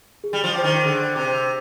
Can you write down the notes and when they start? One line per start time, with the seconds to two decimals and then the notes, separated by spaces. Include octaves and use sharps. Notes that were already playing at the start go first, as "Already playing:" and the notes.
0.24 G#4
0.33 G3
0.44 F3
0.54 C5 G5 D6
0.64 D#3
0.85 D3 G#4
1.15 C3 C5 G5 D6